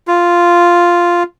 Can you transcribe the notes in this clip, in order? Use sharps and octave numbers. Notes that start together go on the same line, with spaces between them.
F4